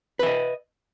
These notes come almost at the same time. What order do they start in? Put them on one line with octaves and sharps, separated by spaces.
B4 E5 D#5